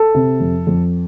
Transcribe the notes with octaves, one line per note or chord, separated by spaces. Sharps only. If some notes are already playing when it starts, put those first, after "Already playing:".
Already playing: A4
C3
F2
F2